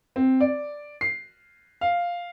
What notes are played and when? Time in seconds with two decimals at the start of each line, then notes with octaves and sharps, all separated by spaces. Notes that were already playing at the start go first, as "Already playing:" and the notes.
0.16 C4
0.41 D5
1.01 C7
1.81 F5